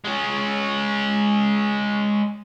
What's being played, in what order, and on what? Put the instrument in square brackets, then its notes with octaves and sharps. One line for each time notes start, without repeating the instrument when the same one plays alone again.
[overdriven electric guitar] G#3 C#4